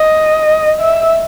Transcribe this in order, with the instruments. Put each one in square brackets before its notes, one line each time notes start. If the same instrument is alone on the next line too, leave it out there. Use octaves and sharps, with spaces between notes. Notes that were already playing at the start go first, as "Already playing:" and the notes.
Already playing: [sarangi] D#5
E5